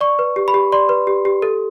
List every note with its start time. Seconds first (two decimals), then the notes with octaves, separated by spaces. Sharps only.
0.01 D5 C#6
0.19 B4
0.36 G4
0.48 B5
0.54 G4
0.72 D5 C6
0.89 B4
1.07 G4
1.25 G4
1.42 A4